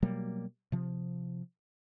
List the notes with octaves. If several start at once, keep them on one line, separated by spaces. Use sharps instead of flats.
B2 F#3 G3 A#3
C3 F3